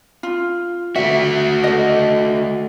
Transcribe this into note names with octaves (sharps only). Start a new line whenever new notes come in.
F4
A3 F#4 E5
A4 D#5